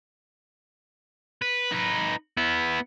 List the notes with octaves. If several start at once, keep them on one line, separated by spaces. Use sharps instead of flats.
B4
D#4 B4
B3 E4